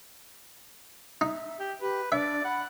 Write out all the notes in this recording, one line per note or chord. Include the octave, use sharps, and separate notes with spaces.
D#4 E5
G4
G4 B4
D4 D5 E5
F#5 B5